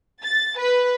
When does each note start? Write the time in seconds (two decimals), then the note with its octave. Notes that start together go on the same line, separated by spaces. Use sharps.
0.23 A6
0.59 B4